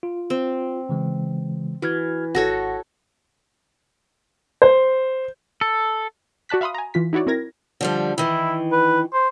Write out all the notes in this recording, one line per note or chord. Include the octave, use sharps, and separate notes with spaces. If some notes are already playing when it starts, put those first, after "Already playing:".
F4
C4
C#3 E3 G#3
E3 F#4 F6 G#6
G#1 F#4 A4 C#5 F#5 A#6
C5
A4
F#4 D5 A5 F#6 B6
E5 F5 B5 C6 D#6
G#5 A#5
E3 F4 B6
D#4 E4 F#4 C#5 D5
C4 E4 A#4 G#6 A#6
D3 F3 G3
D#3 E3 E4
B4
C5